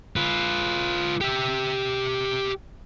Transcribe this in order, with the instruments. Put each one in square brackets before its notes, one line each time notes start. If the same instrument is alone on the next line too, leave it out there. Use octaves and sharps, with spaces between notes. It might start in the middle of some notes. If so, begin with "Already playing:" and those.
[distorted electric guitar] F4 B4
G4 E5